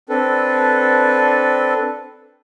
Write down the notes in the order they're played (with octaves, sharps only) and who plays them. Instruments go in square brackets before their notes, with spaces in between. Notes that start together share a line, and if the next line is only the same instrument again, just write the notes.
[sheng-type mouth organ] C4 D4 A4 B4